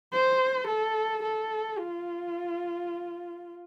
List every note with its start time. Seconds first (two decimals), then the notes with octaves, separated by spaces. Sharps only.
0.12 C5
0.67 A4
1.23 A4
1.79 F4